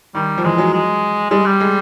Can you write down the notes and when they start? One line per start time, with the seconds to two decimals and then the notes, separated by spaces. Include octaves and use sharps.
0.15 D#3 G3
0.38 F3
0.44 E3 G#3
0.58 F#3
0.74 G#3
1.31 G3 G#3
1.46 G3
1.60 G#3